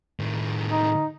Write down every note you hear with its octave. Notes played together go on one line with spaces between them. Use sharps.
A2 D#3
D#4